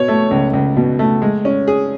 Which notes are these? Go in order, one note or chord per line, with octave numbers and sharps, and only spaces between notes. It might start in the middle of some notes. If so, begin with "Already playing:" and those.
Already playing: B2 C#5
A3
C#2
C#2
B2
A3
G#3
C#4
G#4